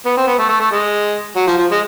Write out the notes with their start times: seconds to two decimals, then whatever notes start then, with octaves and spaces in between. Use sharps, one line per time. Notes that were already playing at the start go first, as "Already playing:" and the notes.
0.05 B3
0.17 C4
0.27 B3
0.38 A3
0.49 A3
0.60 A3
0.71 G#3
1.36 F#3
1.47 F3
1.58 F3
1.71 G#3